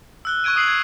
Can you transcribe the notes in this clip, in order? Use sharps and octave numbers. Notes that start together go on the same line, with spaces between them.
E6 F#6 G7
C#6 F#6 G#6 D7 D#7
D#6 E6 C7 F#7
G#6